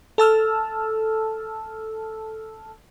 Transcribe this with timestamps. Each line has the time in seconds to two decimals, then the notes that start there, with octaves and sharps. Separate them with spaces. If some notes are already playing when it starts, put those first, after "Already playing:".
0.18 A4 A5 E6 F6